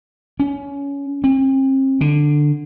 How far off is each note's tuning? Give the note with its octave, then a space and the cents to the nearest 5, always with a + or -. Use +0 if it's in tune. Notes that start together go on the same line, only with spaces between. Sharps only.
C#4 +20
C4 +40
D3 +10